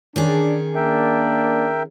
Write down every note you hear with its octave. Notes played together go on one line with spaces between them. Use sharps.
D#3 C#4 D4 G#4
A#3 D4 A#4 E5 G5